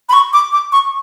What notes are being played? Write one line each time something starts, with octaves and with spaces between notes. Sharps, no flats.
B5
C#6
D6
D6
C#6